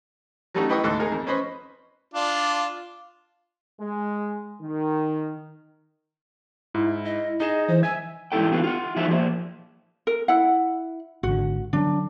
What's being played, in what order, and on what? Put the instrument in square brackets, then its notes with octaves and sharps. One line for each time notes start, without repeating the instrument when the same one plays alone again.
[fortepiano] F#3 G3 A3 C#4 D#4 F#4
E4 B4 D#5 G5 C#6 D#6
D2 G#2 A4 A5 F#6
D#4 G#4 A#4
F2
C#4 B4 C5 D#5 B5 C#6
[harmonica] D4 F4 D5
[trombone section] G#3
D#3
[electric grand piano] G#2 [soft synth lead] E4
[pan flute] D#5
[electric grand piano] D#4 G#4 E7 [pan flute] D#5
[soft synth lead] E3 [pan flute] C5
[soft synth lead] E5 [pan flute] G#5 [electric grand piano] G#6
[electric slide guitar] G#2 E3 F#3 E4 A4 G5
D3 E3 B3 F4 F#4
F4 F#5
F3 F#3 D#4 G#4 E5
F3 A#3 G#4 C5
[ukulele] A#4
E4 F#5
[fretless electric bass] G#1 D3 [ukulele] F#4
[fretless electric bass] D3 F#3 [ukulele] D4